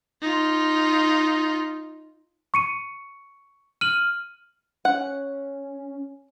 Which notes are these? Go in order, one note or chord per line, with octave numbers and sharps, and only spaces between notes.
D#4 F4
C#6 C#7 D#7
F6 D#7 F#7
C#4 F#5